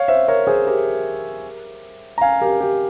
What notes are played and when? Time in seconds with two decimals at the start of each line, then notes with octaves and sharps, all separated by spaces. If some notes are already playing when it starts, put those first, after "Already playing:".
Already playing: C#5 F5
0.08 C5 E5
0.28 A#4 C#5
0.47 G#4 C5
0.67 G4 A#4
2.18 A#5
2.21 F5 G#5
2.41 G4 A#4
2.61 G4